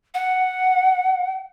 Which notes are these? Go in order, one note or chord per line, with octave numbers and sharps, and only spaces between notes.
F#5